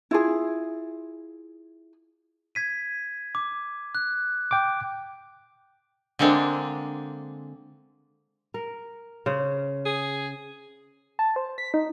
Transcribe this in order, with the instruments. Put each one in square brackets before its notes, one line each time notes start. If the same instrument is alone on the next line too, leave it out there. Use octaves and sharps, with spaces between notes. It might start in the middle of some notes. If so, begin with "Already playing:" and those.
[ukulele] E4 F4 G#4
[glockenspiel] G#6 B6 D#7
D6
F#6
[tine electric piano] G5 D6
[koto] D3 G#3 A#3 C4 D4
[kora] A#4
C#3 C5
[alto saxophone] G#4
[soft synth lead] A5
C5
B6
D#4